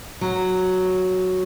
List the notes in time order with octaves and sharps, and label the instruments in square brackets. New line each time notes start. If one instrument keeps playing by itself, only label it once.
[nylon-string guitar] F#3